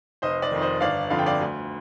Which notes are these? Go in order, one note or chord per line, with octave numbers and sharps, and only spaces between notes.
F1 C5 D#5
D5
F2 D#3
C5 D#5
G1 D5 F5
F2 D3 F3 F5
G5
D5 F5
D2